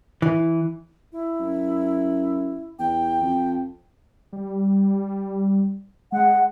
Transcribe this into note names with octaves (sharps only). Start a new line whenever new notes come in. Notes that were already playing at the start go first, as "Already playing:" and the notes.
E3
E4
F#2
E2 G5
F2
G3
G#3 F#5